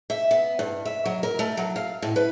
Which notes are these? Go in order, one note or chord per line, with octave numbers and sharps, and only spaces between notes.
E5
B3
G2
E5
F#3
A#4
A3
F#3
F5
A2
B4